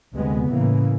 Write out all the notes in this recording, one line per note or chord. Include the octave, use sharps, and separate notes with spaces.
D2 C3 G#3 B3
A2 C#3 E3 A#3